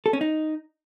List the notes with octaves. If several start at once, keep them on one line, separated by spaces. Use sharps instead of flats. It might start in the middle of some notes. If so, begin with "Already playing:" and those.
A4
C#4
D#4